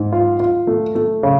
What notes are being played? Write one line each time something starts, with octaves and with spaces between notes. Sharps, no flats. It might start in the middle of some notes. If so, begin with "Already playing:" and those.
Already playing: G#2
F4
F4
A3
A3
C#3